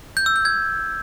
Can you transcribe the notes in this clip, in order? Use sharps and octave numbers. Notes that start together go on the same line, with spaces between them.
G6
E6
G6
G#6